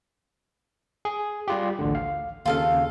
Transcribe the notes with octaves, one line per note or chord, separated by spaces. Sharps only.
G#4
G3 F4 G4
A1 D2 D3
F5
D#2 C#3 F4 A4 F5